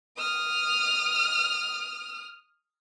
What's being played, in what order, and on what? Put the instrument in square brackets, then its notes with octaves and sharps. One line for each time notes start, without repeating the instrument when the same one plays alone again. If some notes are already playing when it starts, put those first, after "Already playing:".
[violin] D#6 F6